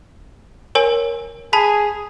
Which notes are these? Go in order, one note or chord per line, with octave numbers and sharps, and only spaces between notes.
A#4 C#5 G#5
G#4 A5 B5 B6